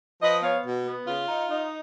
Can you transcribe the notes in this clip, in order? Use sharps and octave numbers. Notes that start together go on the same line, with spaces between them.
F3 B4 D#5
B3 C#5 F5
B2
B3
C#3 F4
D#4
D#4